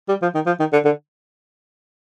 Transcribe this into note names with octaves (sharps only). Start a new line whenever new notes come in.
G3
F3
D#3
F3
D#3
D3
D3